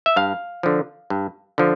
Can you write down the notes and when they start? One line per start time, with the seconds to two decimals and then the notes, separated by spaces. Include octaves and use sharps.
0.06 E5
0.16 G2 F5
0.63 D3 F3
1.10 G2
1.58 D3 F3